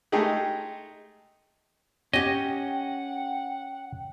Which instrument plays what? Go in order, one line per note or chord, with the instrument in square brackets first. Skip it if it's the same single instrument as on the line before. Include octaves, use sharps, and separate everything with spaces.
[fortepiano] G#3 A3 D#4 G4 G#4
[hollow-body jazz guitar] C#4 G4 [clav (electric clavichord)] D#5 [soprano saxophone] F#5 [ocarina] G5